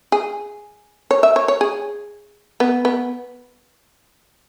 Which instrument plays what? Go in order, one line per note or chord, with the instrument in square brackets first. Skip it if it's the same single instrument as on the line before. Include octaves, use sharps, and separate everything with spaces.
[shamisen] G#4
C#5
E5
C#5
C#5
G#4
B3
B3